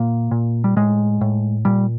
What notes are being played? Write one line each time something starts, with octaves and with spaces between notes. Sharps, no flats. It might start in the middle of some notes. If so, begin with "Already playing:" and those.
Already playing: A#2 A#3
A#2
G3
A2 G#3
A2
A#2 G3